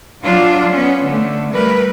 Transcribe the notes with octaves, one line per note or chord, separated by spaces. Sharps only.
F#3 D4 F4
B3 C#4
D3 A3
G3 A3 A#4 B4